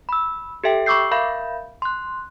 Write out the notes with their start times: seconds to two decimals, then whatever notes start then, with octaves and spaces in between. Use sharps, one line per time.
0.09 B5 E6
0.64 G4 A4 E5 G5
0.86 B5 C#6 D6 E6 G6 C7
1.11 A#4 E5 F5 B5 G6
1.82 C6 F#6